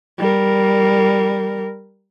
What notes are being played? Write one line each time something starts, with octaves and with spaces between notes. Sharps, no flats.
G3 A#4